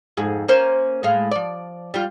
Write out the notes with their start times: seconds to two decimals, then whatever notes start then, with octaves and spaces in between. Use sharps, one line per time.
0.17 F2 G#2 G#4
0.48 A#3 C#4 C5
1.03 A2 G#3 F5
1.31 F3 D5
1.94 G3 F4